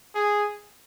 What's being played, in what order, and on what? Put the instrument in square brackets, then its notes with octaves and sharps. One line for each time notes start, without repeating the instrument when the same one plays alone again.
[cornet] G#4